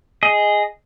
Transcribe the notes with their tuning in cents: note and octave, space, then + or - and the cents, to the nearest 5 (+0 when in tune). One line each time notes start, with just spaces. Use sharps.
G#4 -5 D#5 +0